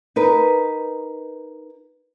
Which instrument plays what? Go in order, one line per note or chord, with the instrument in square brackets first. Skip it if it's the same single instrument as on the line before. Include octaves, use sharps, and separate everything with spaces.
[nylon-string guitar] D#4 A#4 B4